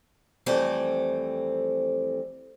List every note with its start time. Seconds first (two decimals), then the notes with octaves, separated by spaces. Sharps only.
0.46 F2 E3 G3 A3 C4 A4